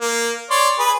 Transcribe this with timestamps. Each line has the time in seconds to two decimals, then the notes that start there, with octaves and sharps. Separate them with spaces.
0.01 A#3
0.51 C#5 D5 C6
0.79 G#4 B4